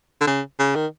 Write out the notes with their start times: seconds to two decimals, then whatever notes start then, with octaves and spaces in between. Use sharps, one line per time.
0.21 D3
0.27 C#3
0.59 C#3
0.75 D#3